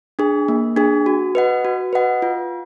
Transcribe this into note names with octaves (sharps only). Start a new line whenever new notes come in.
D4 G#4
A#3
D4 G#4
F#4
B4 D#5 F#5
F#4
B4 D#5 F#5
F4